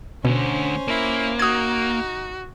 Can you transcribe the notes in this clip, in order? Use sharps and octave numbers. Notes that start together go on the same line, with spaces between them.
D2 B2 D3 C#4 C5
A#3 E4
D#4 F#4 D#6 G#6